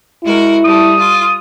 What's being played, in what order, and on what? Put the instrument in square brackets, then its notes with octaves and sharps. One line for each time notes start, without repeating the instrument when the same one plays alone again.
[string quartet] G#3 F#4 A#4 [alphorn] E4
[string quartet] G3 A3 [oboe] D#6
[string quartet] F4